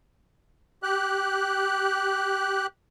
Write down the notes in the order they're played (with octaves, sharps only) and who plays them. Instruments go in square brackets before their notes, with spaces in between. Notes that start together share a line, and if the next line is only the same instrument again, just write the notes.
[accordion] G4 F#6